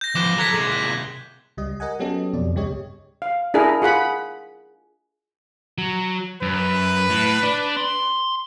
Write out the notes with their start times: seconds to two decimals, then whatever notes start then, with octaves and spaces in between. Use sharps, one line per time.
0.01 G6 A#6
0.15 F3 B3 D6 F#6 G7
0.38 A4 A#5 F#6 G#6 B6
0.55 C3 G#3
0.72 F#6
1.57 C#2 G3 D#5
1.80 A#4 D#5 F#5 G#5
1.99 F#3 B3 C#4 G4 A4 D#5
2.33 F2 B2 D5
2.54 C#2 G2 G#3 G4 C#5 D#5
3.22 F5
3.54 D4 E4 G#4 A#4
3.82 F4 G#4 F#5 B5
5.78 F#3
6.42 F#2 B4
7.10 A2
7.43 D4
7.77 C6